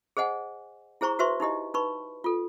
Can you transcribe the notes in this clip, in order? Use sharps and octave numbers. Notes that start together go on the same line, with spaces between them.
G#4 C5 D#5 F#5 G#5
E4 G#4 C5 A#5 C#6
F#4 B4 C5 E5 C6 C#6
D#4 E4 G4 D#5
D#4 B4 B5 C#6
F4 A4